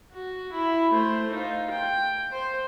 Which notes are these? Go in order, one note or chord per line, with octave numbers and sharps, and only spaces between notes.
F#4
E4
A3 C5
D#4 F4
G5
C5